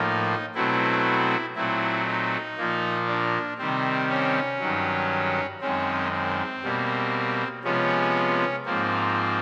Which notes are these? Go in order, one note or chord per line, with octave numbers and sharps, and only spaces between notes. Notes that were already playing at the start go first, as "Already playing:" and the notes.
Already playing: A2 F3 A#3 D#4
B2 F#3 A3 C4 E4
A#2 F#3 A3 C4 E4
D#4
A#2 F3 A#3
D4
C3 D#3 G3 C4
C#4
G2 D#3 F#3
F#2 D#3 G#3 C4 C#4
C4
B2 G3 A#3
C3 F3 G#3 B3 C#4
G#2 F3 A#3 C4